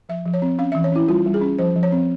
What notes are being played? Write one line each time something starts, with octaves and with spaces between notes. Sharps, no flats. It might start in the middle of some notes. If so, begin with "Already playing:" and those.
F3 E5
F3
C#5
C4
C#4 F5
E3 E5
C#5
C#4 E4
G3 F4
G3
G#4
C#4
F3 C5
F3
C#5
C4